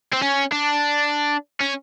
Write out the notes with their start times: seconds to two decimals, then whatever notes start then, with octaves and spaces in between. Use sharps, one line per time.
0.13 C4
0.22 C#4
0.52 D4
1.60 C#4